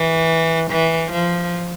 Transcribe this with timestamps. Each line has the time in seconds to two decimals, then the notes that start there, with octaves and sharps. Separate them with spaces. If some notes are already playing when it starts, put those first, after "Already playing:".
Already playing: E3
0.71 E3
1.12 F3